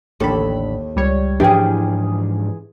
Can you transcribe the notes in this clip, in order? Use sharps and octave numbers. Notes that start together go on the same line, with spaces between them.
A1 D#2 D3 A4 B5
C#2 G3 C#5
G#2 E3 F3 C#4 D4 G4 G#4